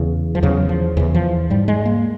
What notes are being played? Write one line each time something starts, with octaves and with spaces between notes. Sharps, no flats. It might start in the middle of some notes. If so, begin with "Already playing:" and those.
Already playing: E2 C#3
F3
E2 C#3 F#3
F3
E2 C#3 E3
F3
G#2 G3
G#3
A#3